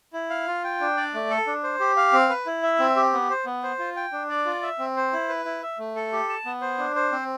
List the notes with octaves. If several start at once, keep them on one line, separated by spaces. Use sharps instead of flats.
E4
F5
F4
G5
D4
D5
A3
A4
D4
C5
G4
F5
C4
B4
E4
E5
C4
G4
B3
C5
B3
C5
F4
G5
D4
D5
F4
E5
C4
C5
E4
B4
E4
E5
A3
A4
G4
A5
B3
C5
D4
C5
C4